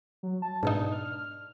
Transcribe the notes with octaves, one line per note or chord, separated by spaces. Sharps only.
F#3
A5
G#2 B2 D4 D#4
F6